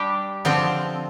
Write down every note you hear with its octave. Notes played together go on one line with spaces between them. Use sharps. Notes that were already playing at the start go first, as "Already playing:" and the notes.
Already playing: G3 D4 G4
D3 F3 C4 F4